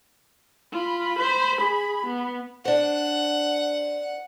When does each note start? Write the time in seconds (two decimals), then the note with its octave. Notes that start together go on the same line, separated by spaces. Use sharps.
0.72 F4 B5
1.19 C5
1.61 G#4
2.06 B3
2.65 D4 C5 F#5